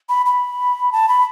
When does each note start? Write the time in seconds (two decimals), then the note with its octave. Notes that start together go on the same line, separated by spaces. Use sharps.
0.09 B5
0.26 B5
0.93 A5
1.09 B5